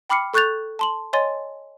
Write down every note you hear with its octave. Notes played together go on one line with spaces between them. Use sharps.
G5 B5 D6 F6 C7 C#7
A4 C#6 F#6 G6 A6 F7
A5 C6 F#7
C#5 D#5 G#5 C6 A6